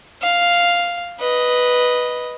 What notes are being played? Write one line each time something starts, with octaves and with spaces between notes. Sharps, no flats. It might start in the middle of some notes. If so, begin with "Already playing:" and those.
F5
B4 D#5